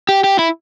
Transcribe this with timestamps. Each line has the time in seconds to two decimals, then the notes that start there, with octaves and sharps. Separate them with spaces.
0.09 G4
0.24 G4
0.39 E4